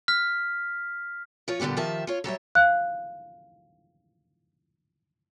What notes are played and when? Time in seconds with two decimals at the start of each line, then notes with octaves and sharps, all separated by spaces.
0.08 F6 B6
1.48 F3 F4 C#5
1.60 A#2 D3 G3 B3 G4
1.77 D#3 F3 G4 E5 A5
2.07 F4 C#5
2.24 F#3 G3 C#5 E5
2.55 F5 F#6